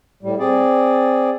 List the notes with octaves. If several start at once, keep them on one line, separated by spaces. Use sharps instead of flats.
A2 G3
C4 G#4 D5